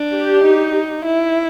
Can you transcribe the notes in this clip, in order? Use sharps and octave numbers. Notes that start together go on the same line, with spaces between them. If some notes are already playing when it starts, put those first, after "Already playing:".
Already playing: D4
G4
D#4
E4